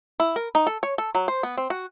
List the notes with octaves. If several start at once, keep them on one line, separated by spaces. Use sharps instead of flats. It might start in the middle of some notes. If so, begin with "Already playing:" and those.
E4
A#4
D#4
A4
C#5
A4
F#3
C5
B3
C4
F#4